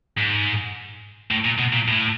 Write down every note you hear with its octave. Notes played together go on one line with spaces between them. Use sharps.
G#2
A2
A#2
B2
A#2
A2